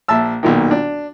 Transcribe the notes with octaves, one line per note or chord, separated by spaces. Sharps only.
A#1 E5 A5 E6
B1 A#2 D#3
D4